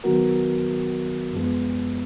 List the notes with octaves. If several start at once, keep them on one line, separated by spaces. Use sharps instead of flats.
D#3 F#3 B3 F#4 A#4
F#2 F3 G#3 B3